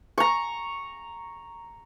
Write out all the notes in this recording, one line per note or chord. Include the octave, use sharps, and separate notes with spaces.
A#5 C#6